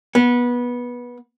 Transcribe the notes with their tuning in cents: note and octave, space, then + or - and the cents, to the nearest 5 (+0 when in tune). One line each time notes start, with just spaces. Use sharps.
B3 -20